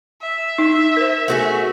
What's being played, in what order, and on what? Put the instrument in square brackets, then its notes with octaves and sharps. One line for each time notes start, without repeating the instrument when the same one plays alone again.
[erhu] E5
[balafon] D#4
A#4 C5
[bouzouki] A3 F#4 G#4